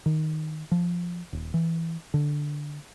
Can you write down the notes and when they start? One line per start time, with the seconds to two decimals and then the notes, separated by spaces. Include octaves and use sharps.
0.06 D#3
0.71 F3
1.33 D#1
1.54 E3
2.14 D3